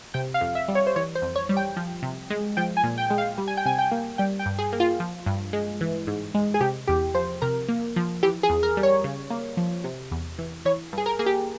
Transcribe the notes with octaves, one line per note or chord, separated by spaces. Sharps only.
C3 G5
F5
F2
E5
G3
C#5
C5
E3 C#5
C5
F2
C#5
G3
G5
F3
C3
G#3
F3 G5
G#5
A#2
G5
G#3
F5
G3
G#5
G5
C3 G#5
G5
A#3
G3 G5
G5
G2
G#4
A#3
F4
F3
G2
G#3
E3
G#2
G#3
G#4
C3 G4
E2 G4
F3 C5
C3 A#4
A#3
F3
E3 G4
G#4
E2
A#4
G3
C#5
C#3
A#3
F3
C3
E2
E3
E3 C#5
G2 G#4
A#4
A#3 G#4
G4